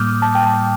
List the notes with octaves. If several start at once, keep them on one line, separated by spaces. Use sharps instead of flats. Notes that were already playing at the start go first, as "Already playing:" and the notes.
Already playing: A2 G3 A#3 D6 D#6 F6 G6
A5
G5
A5